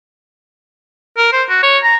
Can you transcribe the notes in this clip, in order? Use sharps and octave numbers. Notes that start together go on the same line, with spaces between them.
A#4
C5
F#4
C#5
A#5